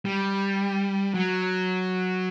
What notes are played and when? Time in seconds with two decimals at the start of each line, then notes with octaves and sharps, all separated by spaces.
0.05 G3
1.14 F#3